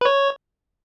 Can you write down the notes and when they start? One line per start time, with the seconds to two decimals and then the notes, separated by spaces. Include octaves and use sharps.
0.01 B4
0.05 C#5